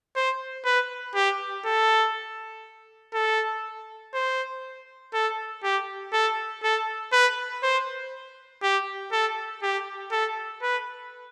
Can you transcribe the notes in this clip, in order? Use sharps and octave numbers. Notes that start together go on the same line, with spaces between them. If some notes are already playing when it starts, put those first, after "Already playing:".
C5
B4
G4
A4
A4
C5
A4
G4
A4
A4
B4
C5
G4
A4
G4
A4
B4